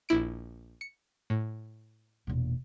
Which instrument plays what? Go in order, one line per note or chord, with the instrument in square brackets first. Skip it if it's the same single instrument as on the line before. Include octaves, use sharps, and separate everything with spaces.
[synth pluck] A#1 E4 D7
C#7
A2
[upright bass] E1 A#2